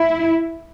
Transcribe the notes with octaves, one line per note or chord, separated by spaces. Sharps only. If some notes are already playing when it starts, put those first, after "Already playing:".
Already playing: E4